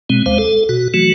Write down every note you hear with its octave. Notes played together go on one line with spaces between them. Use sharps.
B2 G#3 C4
D2 G#3 C5 F5
A4
B2 F#4
E3 F#3 A3 F#4